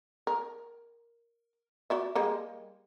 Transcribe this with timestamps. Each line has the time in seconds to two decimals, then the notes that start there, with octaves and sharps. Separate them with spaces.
0.27 A#4
1.90 F#4 D5 E5
2.15 G3 G#3 A#3